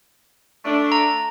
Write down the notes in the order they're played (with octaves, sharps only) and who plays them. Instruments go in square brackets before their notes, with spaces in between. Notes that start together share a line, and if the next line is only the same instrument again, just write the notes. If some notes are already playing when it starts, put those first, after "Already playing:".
[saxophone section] A3 D4
[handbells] A#5